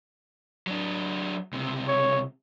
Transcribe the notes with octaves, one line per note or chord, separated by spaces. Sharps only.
F#3 D4
C#2 C3
C#5